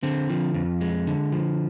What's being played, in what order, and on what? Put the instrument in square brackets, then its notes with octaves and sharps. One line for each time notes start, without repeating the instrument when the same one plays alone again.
[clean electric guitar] D3 C4
F3
F2
G#3
D3
F3